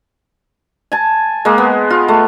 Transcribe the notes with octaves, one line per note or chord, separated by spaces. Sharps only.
G#5 A5
G#3 A#3
B3
F4
A3